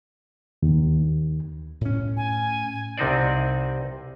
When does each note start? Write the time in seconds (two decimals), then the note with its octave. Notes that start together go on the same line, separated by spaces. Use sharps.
0.63 D#2
1.81 A2 C#4
2.17 G#5
2.98 C2 C3 C4 D#4 C5 D5